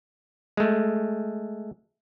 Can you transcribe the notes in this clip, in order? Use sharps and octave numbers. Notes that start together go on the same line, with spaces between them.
G#3 A3